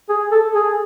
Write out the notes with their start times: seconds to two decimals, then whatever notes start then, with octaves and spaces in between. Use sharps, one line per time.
0.09 G#4
0.32 A4
0.55 G#4